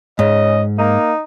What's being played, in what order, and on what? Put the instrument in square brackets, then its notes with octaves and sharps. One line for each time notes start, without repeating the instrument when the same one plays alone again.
[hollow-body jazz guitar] G#2 [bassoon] C#3 [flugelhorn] D#5
[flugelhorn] A#3 [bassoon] D#4